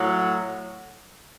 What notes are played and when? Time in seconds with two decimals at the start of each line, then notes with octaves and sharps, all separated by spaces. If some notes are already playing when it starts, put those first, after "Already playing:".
Already playing: A2 F#3